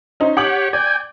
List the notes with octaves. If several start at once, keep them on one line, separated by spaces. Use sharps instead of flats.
C#4 D#4 C5
G4 C#5 F#5 D6 F#7
D5 G5 G#5